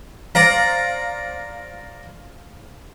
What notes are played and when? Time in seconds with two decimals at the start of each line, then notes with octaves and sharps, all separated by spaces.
0.35 C5 D5 F5 A#5